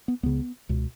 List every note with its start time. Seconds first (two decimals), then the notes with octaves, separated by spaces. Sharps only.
0.08 B3
0.23 C#2 C#3 B3
0.69 C#2 B2